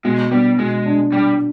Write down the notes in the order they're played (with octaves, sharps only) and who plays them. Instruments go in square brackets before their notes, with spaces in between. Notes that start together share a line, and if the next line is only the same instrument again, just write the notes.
[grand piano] B2 [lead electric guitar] G#3
[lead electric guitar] G3 [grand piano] B3
[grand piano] B2 [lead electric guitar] G#3
[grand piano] D4
[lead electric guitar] G3 [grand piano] D4